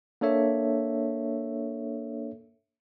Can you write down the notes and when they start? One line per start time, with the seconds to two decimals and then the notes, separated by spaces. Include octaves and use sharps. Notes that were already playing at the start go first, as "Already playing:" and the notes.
0.21 A#3 D4 A4 C#5 E5